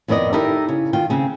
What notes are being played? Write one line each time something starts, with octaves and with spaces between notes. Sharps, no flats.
F2 D#3 B3 D5 D#5
D#4 E4 G4 A4 A#4
C#3
D#3 F4 G5
C#3 C4 G#4